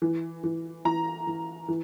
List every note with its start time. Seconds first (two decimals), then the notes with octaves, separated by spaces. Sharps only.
0.02 E3
0.44 E3
0.85 E3 A#5
1.27 E3
1.68 E3